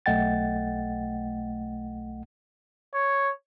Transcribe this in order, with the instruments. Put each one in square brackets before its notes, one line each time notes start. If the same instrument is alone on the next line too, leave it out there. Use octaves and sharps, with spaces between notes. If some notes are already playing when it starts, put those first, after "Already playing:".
[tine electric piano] B1 A3 D#5 F#5 G5 A6
[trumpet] C#5